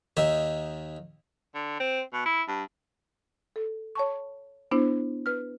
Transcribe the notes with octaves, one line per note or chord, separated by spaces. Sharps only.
D#2 D#3 E5
D3
C4
B2
E4
G2
A4
C#5 A5 C#6
B3 D4 E4 C5
B4 F6